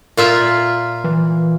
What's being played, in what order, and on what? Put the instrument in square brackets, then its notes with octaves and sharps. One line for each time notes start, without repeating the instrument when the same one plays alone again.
[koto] A#2 F4 E5
[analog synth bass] E3